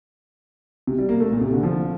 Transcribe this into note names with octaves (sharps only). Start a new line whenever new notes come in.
C3
G3
A#3
A3
A#2
C3
D3
F3